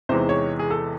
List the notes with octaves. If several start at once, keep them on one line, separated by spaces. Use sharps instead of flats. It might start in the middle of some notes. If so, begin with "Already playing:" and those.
E2 C3 E3 G#3 D#4 C5
C#5
G#4
A4